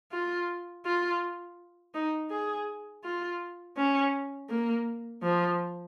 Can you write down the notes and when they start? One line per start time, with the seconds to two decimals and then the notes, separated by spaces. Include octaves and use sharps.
0.12 F4
0.85 F4
1.95 D#4
2.31 G#4
3.04 F4
3.77 C#4
4.50 A#3
5.23 F3